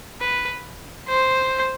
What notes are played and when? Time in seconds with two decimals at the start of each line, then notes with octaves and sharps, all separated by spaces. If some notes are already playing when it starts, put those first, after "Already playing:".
0.21 B4
1.08 C5